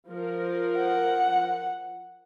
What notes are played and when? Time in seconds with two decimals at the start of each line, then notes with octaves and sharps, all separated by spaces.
0.10 F3 A#4
0.77 F#5